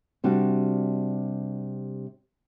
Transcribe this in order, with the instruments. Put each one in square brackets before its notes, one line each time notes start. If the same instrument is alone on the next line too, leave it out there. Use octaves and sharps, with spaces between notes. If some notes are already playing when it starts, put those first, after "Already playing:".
[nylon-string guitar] C3 G3 D4 F#4